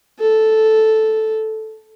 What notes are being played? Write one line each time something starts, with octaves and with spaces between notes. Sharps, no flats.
A4